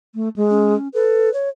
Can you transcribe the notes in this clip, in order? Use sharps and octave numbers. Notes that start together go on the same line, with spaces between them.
A3
G#3
C#4
A4 B4
C#5